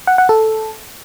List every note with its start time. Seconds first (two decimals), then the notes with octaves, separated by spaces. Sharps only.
0.07 F#5
0.18 F#5
0.29 A4